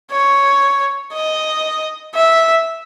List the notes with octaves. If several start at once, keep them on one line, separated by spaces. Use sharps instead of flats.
C#5
D#5
E5